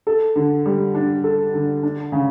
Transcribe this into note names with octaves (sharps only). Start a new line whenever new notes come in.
A4
D3
G3
D4
A4
D3
D4
C#3